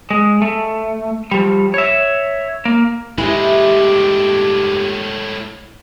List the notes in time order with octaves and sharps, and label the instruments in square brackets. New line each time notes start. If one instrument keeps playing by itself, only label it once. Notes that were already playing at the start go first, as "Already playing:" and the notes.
[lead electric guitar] G#3
A3
F3 G3
C#5 E5
A#3
[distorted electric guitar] A2 G#3 [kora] E3 [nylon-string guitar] E4 [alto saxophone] G4